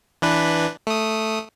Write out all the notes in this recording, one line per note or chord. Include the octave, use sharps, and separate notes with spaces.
E3 D4 B4
A3 D#6